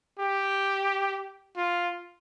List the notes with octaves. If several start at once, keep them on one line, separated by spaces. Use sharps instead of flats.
G4
F4